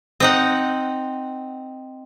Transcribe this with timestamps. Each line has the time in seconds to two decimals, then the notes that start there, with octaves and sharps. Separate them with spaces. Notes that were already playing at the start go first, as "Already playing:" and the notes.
0.20 C4 D#4 F#5